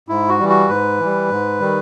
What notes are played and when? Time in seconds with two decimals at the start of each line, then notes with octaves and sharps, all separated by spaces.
0.08 G#2 E4
0.29 F#4
0.39 E3 G3
0.49 F#4
0.69 G#2 B4
0.99 E3 G3
1.30 G#2
1.60 D#3 G3